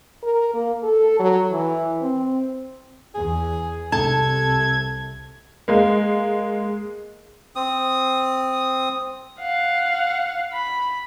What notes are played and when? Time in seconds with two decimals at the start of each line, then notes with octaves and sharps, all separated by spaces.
0.23 A#4
0.54 A#3
0.83 A4
1.20 F#3
1.52 E3
2.02 C4
3.15 E2 G#4
3.92 C2 C3 A4 A5 G#6
5.68 G#3 A#3
7.56 C4 D#6
9.41 F5 F#5
10.53 B5